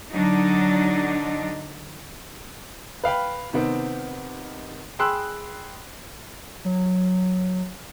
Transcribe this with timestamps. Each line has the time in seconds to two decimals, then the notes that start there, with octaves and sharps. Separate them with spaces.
0.12 D3 F#3 D4 D#4
3.04 B4 F5 G5 B5
3.53 C3 D#3 B3 C4
4.99 G#4 G5 B5 C6 E6 F#6
6.65 F#3